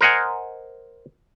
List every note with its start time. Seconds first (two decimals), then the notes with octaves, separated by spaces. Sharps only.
0.01 A#4 C5 D#5 F#5 G#5